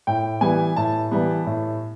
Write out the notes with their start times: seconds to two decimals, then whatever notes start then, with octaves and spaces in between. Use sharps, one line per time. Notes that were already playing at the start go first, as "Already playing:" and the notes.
0.07 A2 G5
0.41 E3 G3 B3 G#5
0.76 A2 A5
1.11 E3 G3 B3
1.46 A2